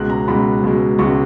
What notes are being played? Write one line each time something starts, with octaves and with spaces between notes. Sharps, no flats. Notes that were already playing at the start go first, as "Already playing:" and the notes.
Already playing: C#2 B2 G#3 F#6
A#5
C#2 B2 G#3 B5
C#2 B2 G#3
C#2 B2 G#3 C#6